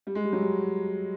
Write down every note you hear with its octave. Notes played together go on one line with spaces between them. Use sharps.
G3
G#3
G3
F#3
G3